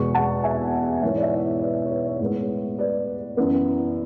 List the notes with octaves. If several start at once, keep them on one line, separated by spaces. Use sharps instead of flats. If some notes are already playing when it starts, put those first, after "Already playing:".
Already playing: E2 B2 G#3 B3 C#6
F#5 A5
E5 G#5
G#2 E3 B3 C#5 E5
D5
C#5 E5
B4 D5
C#5
B4
C#5
A2 G#3 B3
B4 D5
F#2 E3 B3